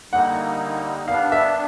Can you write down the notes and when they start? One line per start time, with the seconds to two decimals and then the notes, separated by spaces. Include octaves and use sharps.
0.12 D3 G3 A#3 D#4 F#5
1.08 G3 B3 D4 F5
1.32 E5